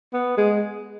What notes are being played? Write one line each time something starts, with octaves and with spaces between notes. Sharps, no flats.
B3
G#3